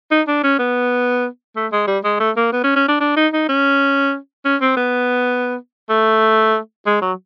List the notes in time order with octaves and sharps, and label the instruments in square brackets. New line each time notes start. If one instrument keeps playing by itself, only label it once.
[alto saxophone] D#4
D4
C#4
B3
A3
G#3
G3
G#3
A3
A#3
B3
C#4
C#4
D4
D4
D#4
D#4
C#4
C#4
C4
B3
A3
G#3
F#3